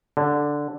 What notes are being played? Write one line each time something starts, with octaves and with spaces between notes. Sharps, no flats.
D3